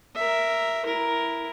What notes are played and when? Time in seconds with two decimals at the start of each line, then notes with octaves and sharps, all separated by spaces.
0.15 A#4 E5
0.85 E4 A#4